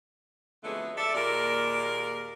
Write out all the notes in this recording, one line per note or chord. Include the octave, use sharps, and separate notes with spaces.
F2 D3 F#3 G#3 A3 B3
A4 D5 E5
D#2 A#2 G#3 A#4 D5